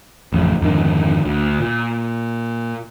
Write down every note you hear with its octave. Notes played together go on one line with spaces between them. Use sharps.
A1 F2 C#3
F2 G#2 D3 D#3
D2
A#2